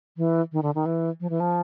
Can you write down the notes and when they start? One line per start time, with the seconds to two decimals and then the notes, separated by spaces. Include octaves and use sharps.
0.17 E3
0.52 D#3
0.63 D3
0.75 D#3
0.86 E3
1.20 F3
1.30 E3
1.40 F3